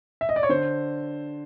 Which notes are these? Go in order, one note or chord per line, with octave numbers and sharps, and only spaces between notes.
E5
D#5
D5
C#5
D3 C5